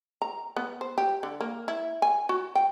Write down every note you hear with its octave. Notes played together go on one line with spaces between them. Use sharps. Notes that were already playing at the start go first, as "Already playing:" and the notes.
A#5
B3
C5
G4
D3
A#3
E4
G#5
F#4
G5